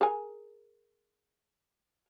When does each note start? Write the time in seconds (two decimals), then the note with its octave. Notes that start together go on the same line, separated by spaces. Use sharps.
0.01 G#4 A#4 G#5